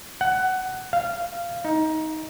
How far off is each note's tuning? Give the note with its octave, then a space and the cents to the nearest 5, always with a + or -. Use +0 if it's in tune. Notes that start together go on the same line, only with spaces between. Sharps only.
F#5 +15
F5 -15
D#4 +15